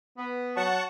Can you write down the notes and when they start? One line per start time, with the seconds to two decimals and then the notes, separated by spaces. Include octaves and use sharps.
0.17 B3
0.57 F#3 F#5 A5 C#6